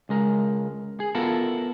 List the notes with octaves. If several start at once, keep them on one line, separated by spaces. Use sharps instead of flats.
C#2 G#3 A#4
G#4
B3 E4 F4 A4 A#4